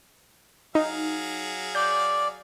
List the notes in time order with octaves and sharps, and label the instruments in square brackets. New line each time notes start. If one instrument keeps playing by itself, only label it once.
[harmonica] F#3 G#4 F5 [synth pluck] D#4
[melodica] D5 [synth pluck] G6